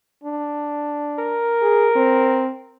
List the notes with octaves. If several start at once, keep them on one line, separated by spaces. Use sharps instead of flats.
D4
A#4
G#4
C4